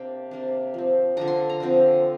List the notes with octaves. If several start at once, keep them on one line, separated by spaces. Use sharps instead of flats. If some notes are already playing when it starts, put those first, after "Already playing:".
Already playing: C3 A#3 D4 G5
C3 A#3 D4
F3 C4
D3 F3 D4 A#5
C6
A#5
D3 F3 C4